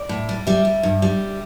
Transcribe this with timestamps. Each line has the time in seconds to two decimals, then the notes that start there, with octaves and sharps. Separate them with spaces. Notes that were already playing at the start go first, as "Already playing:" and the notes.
Already playing: D5
0.09 A2
0.29 G3
0.47 G3 E5
0.65 G3
0.83 G2
1.02 G3